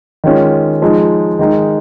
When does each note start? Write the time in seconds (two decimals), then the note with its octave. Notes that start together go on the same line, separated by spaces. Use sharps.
0.24 D#3 G#3 C#4 F4
0.82 F3 G#3 D#4
1.39 D#3 G#3 D#4